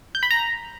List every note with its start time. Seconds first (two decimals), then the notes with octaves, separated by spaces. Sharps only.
0.15 G6
0.23 B5
0.31 A#5